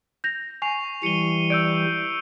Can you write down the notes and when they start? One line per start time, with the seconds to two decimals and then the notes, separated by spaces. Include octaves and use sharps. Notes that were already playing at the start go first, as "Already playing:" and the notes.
0.24 G6 A#6 F7
0.62 G#5 C#6 C7 F7
1.03 E3 G3 C#7 D#7 G7
1.50 D5 E6 G6 D7